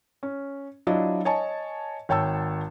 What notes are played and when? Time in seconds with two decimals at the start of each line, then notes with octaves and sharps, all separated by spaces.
0.23 C#4
0.87 F#3 D4 E4 F4 D#5
1.25 C#5 D#5 G#5 A5
2.09 G#1 C#5 G5 A5 E6